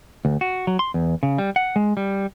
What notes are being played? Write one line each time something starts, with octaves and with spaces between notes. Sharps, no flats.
D2
F#4
F#3
C6
E2
C#3
G3
F#5
G#3
G3